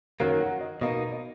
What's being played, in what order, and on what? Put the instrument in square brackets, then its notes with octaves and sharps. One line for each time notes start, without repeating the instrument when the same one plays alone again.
[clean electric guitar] F#2 D#3 F#3 A#3 [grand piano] A#4
[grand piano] F#5
D#5
[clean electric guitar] B2 A#3 D#4 [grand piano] D#5
[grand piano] D#5